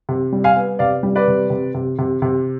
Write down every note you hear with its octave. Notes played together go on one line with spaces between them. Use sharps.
C3
G3
F5 G#5
B3
C3 D5 F5
G3
B4 D5
C3
C3
C3
C3
C3